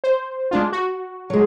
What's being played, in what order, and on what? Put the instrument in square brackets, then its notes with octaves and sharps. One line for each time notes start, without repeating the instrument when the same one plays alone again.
[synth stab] C5
G#3 D4 F4
F#4
[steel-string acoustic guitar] F#3 G#3